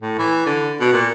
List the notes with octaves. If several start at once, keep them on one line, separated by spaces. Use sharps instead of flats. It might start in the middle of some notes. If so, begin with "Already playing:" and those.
A2
E3
D3
B2
A#2